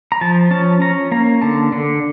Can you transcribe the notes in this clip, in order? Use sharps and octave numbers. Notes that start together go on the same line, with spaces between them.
A#5
F3 A5
C#4 A5
C#4 A#5
A#3 A#5
D3 A5
D3